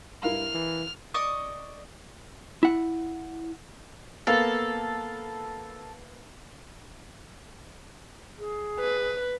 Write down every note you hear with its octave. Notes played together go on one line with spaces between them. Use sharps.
G2 E4 A#4 F5 F6
E3
D5 D#5 C#6 D#6
E4 F#5
A#3 B3 A4 F5
G#4
B4